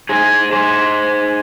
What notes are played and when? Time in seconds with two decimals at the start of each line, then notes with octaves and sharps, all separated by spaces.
0.09 G#4 C5
0.53 G#4 C5